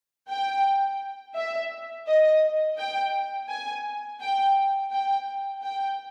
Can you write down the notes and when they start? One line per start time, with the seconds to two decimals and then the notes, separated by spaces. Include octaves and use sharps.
0.29 G5
1.35 E5
2.07 D#5
2.77 G5
3.49 G#5
4.20 G5
4.91 G5
5.62 G5